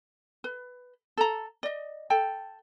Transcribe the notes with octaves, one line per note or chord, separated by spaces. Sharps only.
B4
A4 A#5
D5 D#5
A4 G5